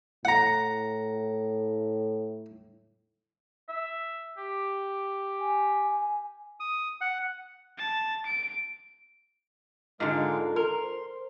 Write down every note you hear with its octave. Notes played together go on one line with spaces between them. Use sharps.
A2 F#5 A#5
E5
G4
G#5
D#6
F#5
A5
D7
G#2 D3 G#3 F4 A#4 F5
A#4 C6
C5